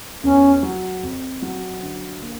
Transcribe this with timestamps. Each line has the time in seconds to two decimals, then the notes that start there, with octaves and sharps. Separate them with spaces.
0.23 E2 C#4
0.63 F#3
1.03 F2
1.42 F#3
1.83 D3
2.22 A#3